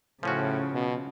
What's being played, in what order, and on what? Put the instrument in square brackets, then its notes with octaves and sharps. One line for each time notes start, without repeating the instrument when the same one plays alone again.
[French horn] A2 [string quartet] C#3 [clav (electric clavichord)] F3 C#4 F#4
[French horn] B2